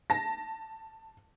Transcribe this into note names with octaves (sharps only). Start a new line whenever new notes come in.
A5 A#6